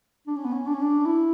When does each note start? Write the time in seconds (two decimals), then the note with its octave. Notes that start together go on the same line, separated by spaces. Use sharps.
0.27 D4
0.36 C#4
0.45 B3
0.53 C#4
0.66 D4
0.74 C#4
0.82 D4
1.06 E4